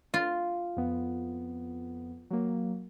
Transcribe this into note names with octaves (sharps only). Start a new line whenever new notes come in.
F4
F2 B3
F#3 A#3